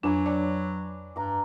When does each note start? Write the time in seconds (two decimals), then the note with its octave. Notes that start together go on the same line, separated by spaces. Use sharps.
0.03 F2 F#3 D4 B4 G#5 D6
0.26 D4 C#5
1.16 G2 A#5 D6